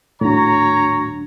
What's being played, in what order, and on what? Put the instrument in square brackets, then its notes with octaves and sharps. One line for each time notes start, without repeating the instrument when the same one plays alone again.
[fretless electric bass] D#1 C#4 D4 [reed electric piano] A2 F#4 [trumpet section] C#5 A#5